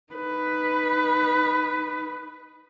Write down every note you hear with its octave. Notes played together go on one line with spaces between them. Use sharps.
D#4 B4